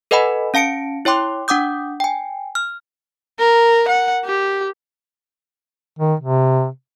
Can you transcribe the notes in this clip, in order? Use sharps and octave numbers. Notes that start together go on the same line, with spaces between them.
A4 B4 D#5 F#5 G#5 B5
C#4 F5 A5 C#7 D7
E4 C#5 G5 C6 D6
D4 F#5 D6 D#6 G6
G5 G#5
F6
A#4
F#5
G4
D#3
C3